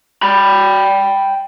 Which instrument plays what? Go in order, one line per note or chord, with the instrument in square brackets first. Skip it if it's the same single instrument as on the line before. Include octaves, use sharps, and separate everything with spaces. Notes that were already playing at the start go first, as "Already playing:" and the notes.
[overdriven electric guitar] G5 B5